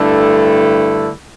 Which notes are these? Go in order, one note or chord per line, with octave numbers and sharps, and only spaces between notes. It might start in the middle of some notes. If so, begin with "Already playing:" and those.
Already playing: G2 D3 A3 E4